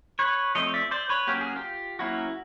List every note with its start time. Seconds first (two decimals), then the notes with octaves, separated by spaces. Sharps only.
0.19 B4 C#5
0.55 F3 A3 C4 C#5 D#5
0.74 D5 E5
0.91 C5 D5
1.09 B4 C#5
1.27 F#3 A#3 C#4 G4
1.41 G#4
1.56 F4 G4
1.99 F#3 A#3 C#4 E4 F#4